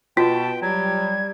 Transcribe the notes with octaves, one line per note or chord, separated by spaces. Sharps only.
B2 F4 G5 A5
F#3 G3 G#6